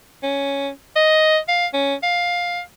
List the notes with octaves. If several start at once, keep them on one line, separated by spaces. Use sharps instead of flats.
C#4
D#5
F5
C#4
F5